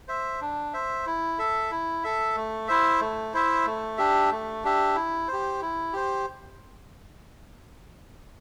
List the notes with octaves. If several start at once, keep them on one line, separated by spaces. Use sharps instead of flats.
C5 E5
D4
C5 E5
E4
A4 E5
E4
A4 E5
A3
E4 C5 E5
A3
E4 C5 E5
A3
D4 G4 E5
A3
D4 G4 E5
E4
C5
G4
E4
G4 C5